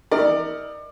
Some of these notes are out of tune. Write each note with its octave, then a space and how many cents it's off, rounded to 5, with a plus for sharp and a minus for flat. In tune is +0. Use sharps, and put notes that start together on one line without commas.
D#4 +35 A#4 +0 D5 +30